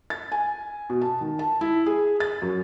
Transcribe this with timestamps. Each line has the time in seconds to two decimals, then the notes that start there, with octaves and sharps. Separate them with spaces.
0.10 A6
0.32 G#5
0.90 B2
1.02 A5
1.21 D#3
1.39 A5
1.61 E4
1.86 G#4
2.20 A6
2.42 F#2